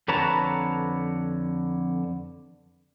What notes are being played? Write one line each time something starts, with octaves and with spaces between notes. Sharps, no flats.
F2 D3 B4 C#5 A5 A#5